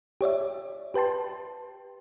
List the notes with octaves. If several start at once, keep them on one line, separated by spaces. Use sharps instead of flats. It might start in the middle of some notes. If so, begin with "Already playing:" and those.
G4 C#5 D5 E5
G4 B4 G5 A5 C6